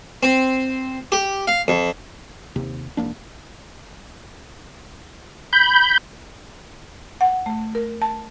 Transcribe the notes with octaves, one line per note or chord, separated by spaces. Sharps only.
C4
G4
F5
F2
D#2 C3
E1 A2 A#3 D4
B5 G6
F#5
A3
A#4
A5